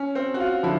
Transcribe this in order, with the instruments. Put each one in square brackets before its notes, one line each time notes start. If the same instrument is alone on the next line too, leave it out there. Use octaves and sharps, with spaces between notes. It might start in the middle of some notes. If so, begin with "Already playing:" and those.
Already playing: [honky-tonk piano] C#4
C4
F#4
F4
[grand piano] D3 F3 [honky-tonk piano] E4